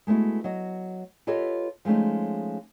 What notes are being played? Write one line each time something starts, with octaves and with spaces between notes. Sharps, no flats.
G#3 A3 B3 E4 F#4
F#3 D#5
F4 G4 A4 B4 C#5 D#5
F3 G#3 A3 C#4 D#4